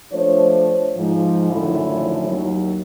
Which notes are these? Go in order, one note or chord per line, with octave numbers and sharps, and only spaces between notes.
F3 A3 D4 C5 C#5
G#2 F3
F#2 A2 D3 D#3 F3 E4
D#2 F#3